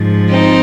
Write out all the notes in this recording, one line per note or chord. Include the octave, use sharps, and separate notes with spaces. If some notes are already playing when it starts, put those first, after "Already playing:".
Already playing: G#2 F3
C4 D#4